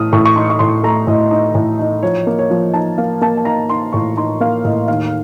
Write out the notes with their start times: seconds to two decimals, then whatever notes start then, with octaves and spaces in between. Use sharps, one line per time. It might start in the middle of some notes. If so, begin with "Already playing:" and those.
Already playing: A2 A3 D#6 F6
0.13 A2 C#6
0.25 C#6
0.36 D#4 C6
0.50 C#6
0.59 A2 C6
0.83 A3 A#5
1.07 A2 D#5
1.31 D#4
1.55 A2
1.79 D#4
2.03 F3 C#5
2.27 A#3
2.39 C#5
2.50 F3
2.74 D#4 A5
2.98 A#3 F5
3.21 A#3 A5
3.37 A5
3.45 D#4 A#5
3.70 D#4 C6
3.93 A2 C#6
4.17 D#4 C6
4.40 A#3 F5
4.65 A2 D#5
4.88 D#2 F5